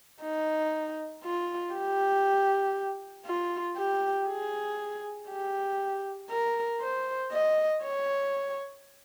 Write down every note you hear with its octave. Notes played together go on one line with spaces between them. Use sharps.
D#4
F4
G4
F4
G4
G#4
G4
A#4
C5
D#5
C#5